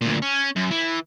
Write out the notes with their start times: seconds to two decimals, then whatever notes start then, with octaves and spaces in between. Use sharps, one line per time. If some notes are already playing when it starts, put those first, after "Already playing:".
0.01 D2 A#2
0.22 C#4
0.56 F#2
0.71 E3